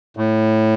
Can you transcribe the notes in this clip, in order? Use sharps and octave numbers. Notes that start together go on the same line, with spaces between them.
A2